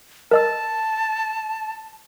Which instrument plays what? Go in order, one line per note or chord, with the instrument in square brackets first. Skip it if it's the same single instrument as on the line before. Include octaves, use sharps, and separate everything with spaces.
[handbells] A#4 D#5 E6 [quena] A5